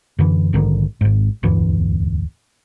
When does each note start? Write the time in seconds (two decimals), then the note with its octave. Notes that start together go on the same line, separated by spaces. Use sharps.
0.19 F#2 D3 E3
0.53 A#1 G#2 D3 D#3
1.01 G#1 G#2
1.43 E1 D2 G2 E3